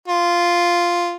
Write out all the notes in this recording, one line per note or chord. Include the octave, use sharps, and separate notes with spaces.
F4